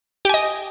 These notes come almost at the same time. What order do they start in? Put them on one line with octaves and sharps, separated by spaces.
G4 G#5 D#5